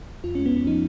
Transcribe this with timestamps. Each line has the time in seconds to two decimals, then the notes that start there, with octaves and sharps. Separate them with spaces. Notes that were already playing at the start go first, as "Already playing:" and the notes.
0.24 F2 F4
0.35 G#3 C#4
0.46 B3
0.53 F2 C#4
0.67 F3 D#4